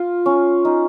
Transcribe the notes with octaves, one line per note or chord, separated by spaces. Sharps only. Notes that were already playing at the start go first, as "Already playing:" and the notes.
Already playing: F4
C#4
D#4